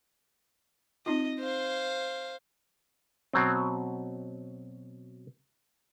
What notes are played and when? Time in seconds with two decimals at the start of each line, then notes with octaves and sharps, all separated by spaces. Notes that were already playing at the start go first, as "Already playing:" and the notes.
1.06 C4 D#4 F4 D#5
1.39 C5 F5
3.33 B2 F#3 C4